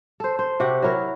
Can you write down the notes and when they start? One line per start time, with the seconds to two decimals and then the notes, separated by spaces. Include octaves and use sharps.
0.20 A4 C5
0.39 C5
0.60 C3 F#4 G4 F#5
0.83 F#3 E4 A#4 C#5